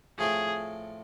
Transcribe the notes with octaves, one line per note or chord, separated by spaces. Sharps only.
A2 F3 A3 C4 G#4